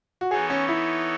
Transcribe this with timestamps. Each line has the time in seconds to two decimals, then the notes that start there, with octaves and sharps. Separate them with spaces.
0.21 F#4
0.31 E3 B3 D#4 G#4 A4 C#5
0.50 C#4
0.69 E4